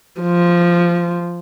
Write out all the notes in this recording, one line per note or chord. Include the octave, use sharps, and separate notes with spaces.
F3